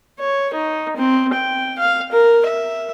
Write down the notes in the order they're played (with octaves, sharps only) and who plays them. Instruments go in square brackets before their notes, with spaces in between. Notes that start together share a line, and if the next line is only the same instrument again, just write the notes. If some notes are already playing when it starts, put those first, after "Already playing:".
[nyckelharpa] C#5
D#4
C4
G5
F5
A#4
E5